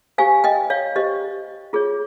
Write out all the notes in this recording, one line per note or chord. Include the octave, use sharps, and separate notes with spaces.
G4 C5 F5 G#5
D#5 G5
C#5 F5
G4 C5 D#5
F4 G#4 C#5